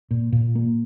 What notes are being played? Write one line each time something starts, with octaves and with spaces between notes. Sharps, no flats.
A#2
A#2
A#3